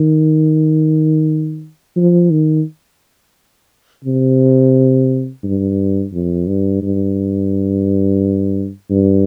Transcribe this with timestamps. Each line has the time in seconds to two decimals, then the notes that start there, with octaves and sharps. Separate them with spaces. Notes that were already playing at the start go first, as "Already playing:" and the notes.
Already playing: D#3
1.96 F3
2.30 D#3
4.04 C3
5.43 G2
6.13 F2
6.47 G2
6.82 G2
8.91 G2